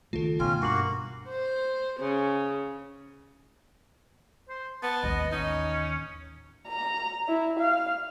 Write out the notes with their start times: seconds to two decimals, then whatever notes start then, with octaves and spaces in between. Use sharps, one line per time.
0.13 C#2 D#3 A3 F4 A4
0.40 B2 C#4 F4 G5
0.62 G2 A#3 F#4 C6 C7 F#7
1.28 C5
2.00 C#3
4.49 C5
4.83 B3 A5
5.03 A1 D#2 D#5
5.32 C#4 D#4
6.67 A#5
7.28 E4
7.59 F5